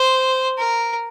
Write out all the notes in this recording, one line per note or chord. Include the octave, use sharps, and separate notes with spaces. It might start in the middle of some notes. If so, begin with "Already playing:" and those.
Already playing: C5
A#4